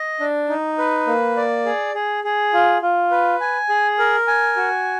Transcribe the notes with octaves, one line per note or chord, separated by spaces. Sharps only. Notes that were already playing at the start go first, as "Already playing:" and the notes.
Already playing: D#5
D4
D#4
B4
A#3
D5
G#4
G#4
G#4
F4
F4
B4
G#5
G#4
A#4
G#5
F#4